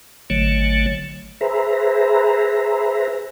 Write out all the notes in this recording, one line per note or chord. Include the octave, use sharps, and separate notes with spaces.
G#1 D3 F#3 A3 C#5
G#4 B4 C5 E5 A#5